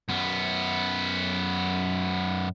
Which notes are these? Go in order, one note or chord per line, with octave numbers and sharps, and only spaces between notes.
F#2 B3